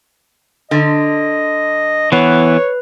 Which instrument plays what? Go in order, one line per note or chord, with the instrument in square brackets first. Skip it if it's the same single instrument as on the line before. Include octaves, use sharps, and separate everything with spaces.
[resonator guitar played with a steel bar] D3 [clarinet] D#5
[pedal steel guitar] E3 B3 [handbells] B4 [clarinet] C#5